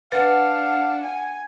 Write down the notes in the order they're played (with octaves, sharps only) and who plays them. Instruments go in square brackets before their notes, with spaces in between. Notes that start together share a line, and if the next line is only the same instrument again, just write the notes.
[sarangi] D4 [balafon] B4 [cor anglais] F5 [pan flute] F#5
[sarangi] G#5